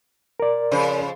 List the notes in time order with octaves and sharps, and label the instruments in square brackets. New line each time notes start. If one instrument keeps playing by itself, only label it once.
[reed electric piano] A#4 D5
[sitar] F2 C#3 C5